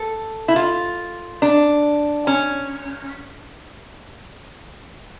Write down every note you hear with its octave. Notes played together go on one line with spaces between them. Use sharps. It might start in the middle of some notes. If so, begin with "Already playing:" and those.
Already playing: A4
E4
F4
D4
C#4